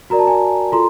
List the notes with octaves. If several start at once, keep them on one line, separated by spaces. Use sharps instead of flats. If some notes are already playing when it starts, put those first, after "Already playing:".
F#4 A#4 D5 A#5
A5
G#5 A#5
F4 A4 A#5 C6